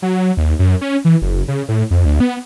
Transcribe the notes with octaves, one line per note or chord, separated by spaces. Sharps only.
F#3
D#2
F#2
C#4
E3
F#1
C#3
A2
F2
D2
B3